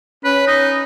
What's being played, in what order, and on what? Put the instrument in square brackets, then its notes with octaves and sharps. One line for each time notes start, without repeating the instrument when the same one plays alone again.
[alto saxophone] C#4 [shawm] B4
[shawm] D#4